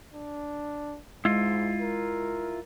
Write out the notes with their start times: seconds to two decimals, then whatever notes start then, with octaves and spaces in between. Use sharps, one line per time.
0.14 D4
1.25 G#2 G#3 E4 F4
1.81 A#4